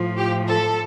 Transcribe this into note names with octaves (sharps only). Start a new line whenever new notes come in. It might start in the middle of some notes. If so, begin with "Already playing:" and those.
Already playing: A2 F3
G4
A4